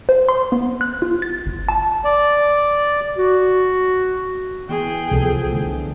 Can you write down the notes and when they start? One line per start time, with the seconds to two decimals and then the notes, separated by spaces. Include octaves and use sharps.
0.09 C5
0.29 C6
0.52 B3
0.81 F#6
1.02 F4
1.22 A6
1.46 G1
1.69 A5
2.05 D5
3.17 F#4
4.69 E3 B3 G#4 G5
5.12 C2 F3 B3 A4
5.52 D3 A3